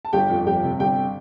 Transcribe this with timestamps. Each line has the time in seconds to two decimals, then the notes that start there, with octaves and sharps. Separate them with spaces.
0.05 A5
0.13 G1 G4 G5
0.30 F2
0.46 G1 G4 G5
0.63 C3
0.79 G1 G4 G5